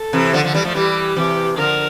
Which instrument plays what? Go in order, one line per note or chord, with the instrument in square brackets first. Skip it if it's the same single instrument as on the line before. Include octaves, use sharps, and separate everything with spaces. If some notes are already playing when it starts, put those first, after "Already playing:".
Already playing: [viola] A4
[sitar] C3 E3
D3 F3
D3 F3
E3 G3
F3 A3
[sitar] E3 G3 [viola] G4
[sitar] C3 E3 [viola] G4
[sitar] D3 F3 [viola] A#4